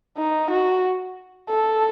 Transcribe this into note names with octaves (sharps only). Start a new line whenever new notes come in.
D#4
F#4
A4